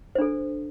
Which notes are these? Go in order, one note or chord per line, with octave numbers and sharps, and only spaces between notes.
D4 A4 C5